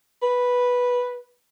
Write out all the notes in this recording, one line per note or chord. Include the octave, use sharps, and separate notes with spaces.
B4